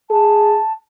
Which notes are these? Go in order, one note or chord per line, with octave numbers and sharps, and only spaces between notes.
G#4 A5